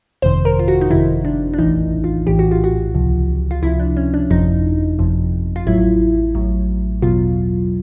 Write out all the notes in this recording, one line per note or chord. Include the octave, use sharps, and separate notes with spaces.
G1 F2 C3 D#3 C5
A#4
F4
F#4
D#4
G1 F2 C3 D#3 E4
D4
D4
A#1 A2 E3 D#4
F4
A#1 A2 E3 G4
F#4
F4
F#4
C#2 C3 F3
F4
C#2 C3 F3 E4
D4
C#4
D4
G1 F2 C3 F3 D#4
G1 F2 C3 F3
F4
A1 A2 F#3 E4
A1 A2 F#3
E2 B2 F#3 F4